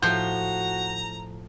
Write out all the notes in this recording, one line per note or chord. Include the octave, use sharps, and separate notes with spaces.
A2 F3 F#4 A#5 G6